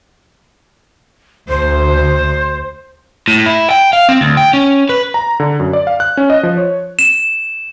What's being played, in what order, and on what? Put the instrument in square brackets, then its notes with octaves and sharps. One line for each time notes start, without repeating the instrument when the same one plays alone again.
[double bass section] D2 [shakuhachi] C5
[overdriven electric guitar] A2
E4
G5
F5
C4
D2
G5
C#4
B4
[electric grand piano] A#5
D3
F#2
D5
F5
F#6
C#4
D#5
F3
C#5
[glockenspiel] E7